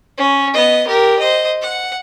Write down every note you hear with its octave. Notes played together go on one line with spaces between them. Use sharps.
C#4
B3 D#5
G4 A#4
C5 D#5
F#5